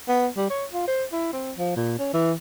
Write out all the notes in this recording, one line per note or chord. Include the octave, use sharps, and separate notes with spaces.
B3
G3
C#5
F4
C5
E4
C4
F3
A#2
C#4
E3